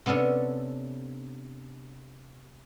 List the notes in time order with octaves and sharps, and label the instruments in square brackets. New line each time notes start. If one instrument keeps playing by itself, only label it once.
[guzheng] C3 B3 C#4 D4 A4